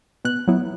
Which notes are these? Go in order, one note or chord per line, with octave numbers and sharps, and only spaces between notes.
B2 F#6
F#3 B3 E4